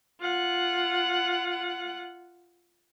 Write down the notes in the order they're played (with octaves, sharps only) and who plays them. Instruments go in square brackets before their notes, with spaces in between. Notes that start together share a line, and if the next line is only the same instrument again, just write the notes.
[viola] F4 F#5